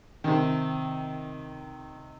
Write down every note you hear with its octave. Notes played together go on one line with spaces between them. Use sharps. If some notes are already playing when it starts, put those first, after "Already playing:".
C3 D#3